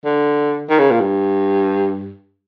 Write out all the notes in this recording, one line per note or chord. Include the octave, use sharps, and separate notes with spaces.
D3
D#3
C#3
A#2
G2